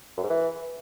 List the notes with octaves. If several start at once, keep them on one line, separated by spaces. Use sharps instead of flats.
F#2
G#2
E3